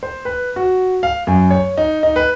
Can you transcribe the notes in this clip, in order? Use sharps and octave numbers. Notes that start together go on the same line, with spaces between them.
C5
B4
F#4
F5
F#2
C#5
D#4
D#4
B4